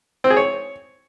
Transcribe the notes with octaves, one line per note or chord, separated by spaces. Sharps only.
C4
G#4
C#5